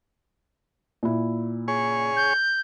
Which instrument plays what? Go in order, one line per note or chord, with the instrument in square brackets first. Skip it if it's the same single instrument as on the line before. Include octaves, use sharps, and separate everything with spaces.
[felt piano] A#2 E4
[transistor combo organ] G#4 C#5
[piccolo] G6